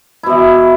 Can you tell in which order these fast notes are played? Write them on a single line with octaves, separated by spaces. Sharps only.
E4 B2 E3